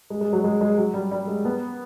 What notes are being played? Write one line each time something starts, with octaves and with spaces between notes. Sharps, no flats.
G#3
G#3
F#3
G#3
G#3
F#3
G3
G3
G#3
B3